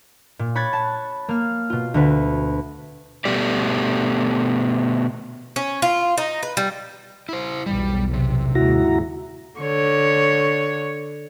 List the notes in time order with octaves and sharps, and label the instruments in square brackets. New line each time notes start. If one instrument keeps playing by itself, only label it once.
[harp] A#2
C#5 B5 F#6 G#6 A6
A5
A#3 F6
B2 F4
D2 D3 B4
[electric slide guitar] B2 A3 G4 D5
[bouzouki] C#4
F4
D#4
B4
G3
[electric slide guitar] E4 C5
[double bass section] B1 E2 [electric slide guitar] G3
[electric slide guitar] C3
[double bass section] D#2 G#2 C#3 [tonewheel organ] E4 F#4 A#5
[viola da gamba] D3 C#5